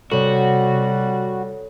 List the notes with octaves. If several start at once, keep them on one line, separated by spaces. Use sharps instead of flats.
C3 G3 F#4 A4 C#5